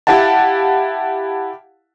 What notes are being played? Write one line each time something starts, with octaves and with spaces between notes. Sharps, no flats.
E4 G4 F5 F#5 A5